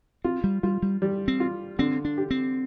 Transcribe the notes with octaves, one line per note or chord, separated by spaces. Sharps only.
C4 F4
G3
G3 F4
G3
G3
C4
F4
D3 C4
D4
G4
C4